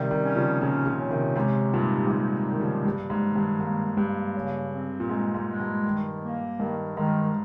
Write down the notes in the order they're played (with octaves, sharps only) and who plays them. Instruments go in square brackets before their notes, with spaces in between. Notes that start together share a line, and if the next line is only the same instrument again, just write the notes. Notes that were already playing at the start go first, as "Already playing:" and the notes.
Already playing: [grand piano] C3 D#3 [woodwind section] G3
[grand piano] C3 D#3
[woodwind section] C#4
[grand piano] C#3 F3
[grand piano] A#2 C#3 [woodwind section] C#4
[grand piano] A#2 C#3
[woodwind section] C#4
[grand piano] C3 D#3
[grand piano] G#2 C3 [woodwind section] G4
[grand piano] G2 A#2 [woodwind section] D#4
[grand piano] G2
[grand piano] G#2 [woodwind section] G4
[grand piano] D#3 [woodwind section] G3
[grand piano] C#3 F3
[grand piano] G2 [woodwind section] A#3
[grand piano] G#2
[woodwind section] D#3
[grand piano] G2
[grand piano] G#2 [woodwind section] A#3
[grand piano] G2 [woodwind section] A#3
[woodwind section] C#3
C4
[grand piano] A#2
[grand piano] G#2 [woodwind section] G#3
[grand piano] G#2
[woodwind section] G#3
[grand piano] G2
[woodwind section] D#3
A#3
[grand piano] G2 [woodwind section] D#3
[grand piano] G#2 [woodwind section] D#3